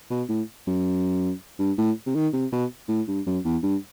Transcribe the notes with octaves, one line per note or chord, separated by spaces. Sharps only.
B2
A2
F#2
G2
A2
C3
D#3
C3
B2
A2
G2
F#2
E2
G2